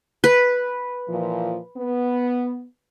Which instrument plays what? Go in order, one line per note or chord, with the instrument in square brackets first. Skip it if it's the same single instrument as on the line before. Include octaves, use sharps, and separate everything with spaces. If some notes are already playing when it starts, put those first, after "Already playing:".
[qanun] B4
[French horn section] A#2 E3 F3
B3